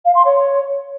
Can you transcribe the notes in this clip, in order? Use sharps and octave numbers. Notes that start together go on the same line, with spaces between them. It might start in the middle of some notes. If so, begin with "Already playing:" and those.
F5
C6
C#5